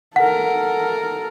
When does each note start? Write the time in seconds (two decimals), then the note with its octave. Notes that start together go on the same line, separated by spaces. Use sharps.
0.16 A4 A#4 F#5